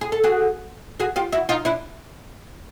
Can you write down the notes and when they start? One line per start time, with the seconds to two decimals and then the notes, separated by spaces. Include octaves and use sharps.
0.01 G#4
0.12 A4
0.24 F#4 G#4
1.00 F#4 G#4
1.16 F4 G4
1.32 E4 F#4
1.49 D#4 F4
1.65 D4 E4